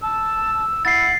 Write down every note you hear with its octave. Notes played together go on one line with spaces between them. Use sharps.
A5 E6
E4 F#5 A6 C7